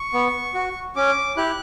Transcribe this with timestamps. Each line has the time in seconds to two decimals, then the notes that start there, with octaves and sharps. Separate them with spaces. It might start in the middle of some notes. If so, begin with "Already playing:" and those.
Already playing: C#6
0.14 B3
0.54 F#4
0.96 C#4 D6
1.37 E4 G4 F#6